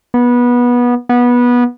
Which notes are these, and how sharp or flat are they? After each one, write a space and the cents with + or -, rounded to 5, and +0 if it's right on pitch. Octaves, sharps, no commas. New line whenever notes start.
B3 -20
B3 -20